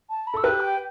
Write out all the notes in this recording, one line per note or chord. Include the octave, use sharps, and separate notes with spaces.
A5
B5
A4 E6
G4 B4 F#6
G5